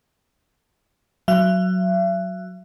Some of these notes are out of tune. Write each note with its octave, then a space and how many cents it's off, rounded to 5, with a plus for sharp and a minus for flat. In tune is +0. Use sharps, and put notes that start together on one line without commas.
F#3 +0 E5 +40